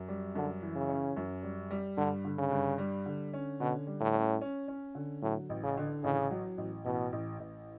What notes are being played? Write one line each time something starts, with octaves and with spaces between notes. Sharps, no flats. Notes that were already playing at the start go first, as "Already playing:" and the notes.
Already playing: F#2
G3
F#2 D3
E3
C#3
C#4
F#2
G3
G3
G2 D3
D3
C#3
G2
G3
D3
C#4
B2 D3
G3
A2
C#4
C#4
C#4
D3
A2 F#3
A1
C#3
D3
A1 C#3
F#3
A1
A1 B2
A1
A1